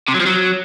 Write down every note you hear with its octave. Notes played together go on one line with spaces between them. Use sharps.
C3
F#3
F3
F#3